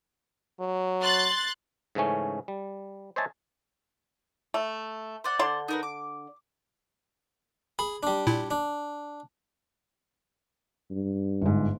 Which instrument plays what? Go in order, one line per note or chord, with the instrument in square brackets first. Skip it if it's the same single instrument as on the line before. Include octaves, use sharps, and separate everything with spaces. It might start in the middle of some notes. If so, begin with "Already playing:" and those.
[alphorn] F#3
[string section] C6 F#6 A6
[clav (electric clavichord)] G#2 C#3 E3 A3 C#4
G3
C5 C#5 D#5 E5 G#5 A5
[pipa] A3
[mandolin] C5 D5 F#5
[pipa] D3 D4 C6
[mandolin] D#4 A#4 B4
D6
[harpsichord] G#4 [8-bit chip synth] B5
[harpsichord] G3 D4
[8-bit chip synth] A#2 E4
[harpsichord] D4
[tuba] G2
[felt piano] G1 G#2